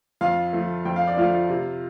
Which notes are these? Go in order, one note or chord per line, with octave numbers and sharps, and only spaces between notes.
F2 F4 F5
F3 A3
F2 G5
F5
D5
F3 A3 F4 F5
C3